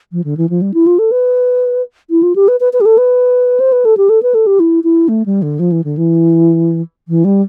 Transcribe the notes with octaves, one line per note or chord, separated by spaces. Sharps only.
F3
D3
E3
F3
G3
E4
F4
A4
B4
E4
F4
G4
B4
B4
B4
G4
A4
B4
C5
B4
A4
G4
A4
B4
A4
G4
E4
E4
A3
G3
D3
F3
E3
D3
E3
E3
G3